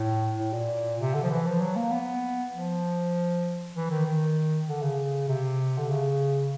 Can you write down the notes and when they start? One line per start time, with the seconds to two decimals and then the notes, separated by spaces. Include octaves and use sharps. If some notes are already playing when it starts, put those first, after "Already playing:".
Already playing: A2
0.38 A2
0.53 A#2
1.00 C3
1.14 D3
1.24 F3
1.31 E3
1.46 F3
1.61 F#3
1.76 A#3
1.91 B3
2.52 F3
3.76 E3
3.91 D#3
4.06 D#3
4.67 D3
4.82 C#3
5.29 C3
5.78 D3
5.89 C#3